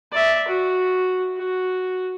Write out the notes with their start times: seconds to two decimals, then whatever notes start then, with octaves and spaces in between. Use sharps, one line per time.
0.12 D5 E5
0.47 F#4
1.37 F#4